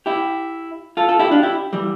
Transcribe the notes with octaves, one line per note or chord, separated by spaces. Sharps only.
E4 G4
F4 A4
F4 A4
E4 G4
D4 F4
E4 G4
E3 G3